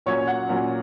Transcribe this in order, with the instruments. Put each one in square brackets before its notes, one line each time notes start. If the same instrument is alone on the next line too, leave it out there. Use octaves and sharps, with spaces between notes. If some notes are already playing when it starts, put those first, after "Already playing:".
[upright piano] A#2 F#3 C#4 C#5
F#5
A#2 F#3 C#4